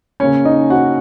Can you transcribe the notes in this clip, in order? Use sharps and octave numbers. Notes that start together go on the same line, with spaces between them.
C#3 A#3 C#4 C#5
D#4 D#5
F#4 F#5